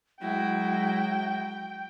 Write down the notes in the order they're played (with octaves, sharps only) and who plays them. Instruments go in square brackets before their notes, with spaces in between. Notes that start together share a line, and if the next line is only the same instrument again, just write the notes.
[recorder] F#3 [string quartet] G#3 E4 F#4 [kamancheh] G5